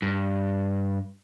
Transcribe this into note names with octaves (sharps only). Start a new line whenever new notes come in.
G2